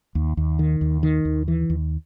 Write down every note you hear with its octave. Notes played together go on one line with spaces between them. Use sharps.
D#2
D#2
D#3
D#2
D#3
D#2
E3
D#2